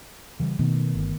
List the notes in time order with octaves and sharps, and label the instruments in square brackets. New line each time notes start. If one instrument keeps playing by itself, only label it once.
[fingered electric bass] C#3 E3 G3
[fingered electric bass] B2 [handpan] D#3 A3 B3
[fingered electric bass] G1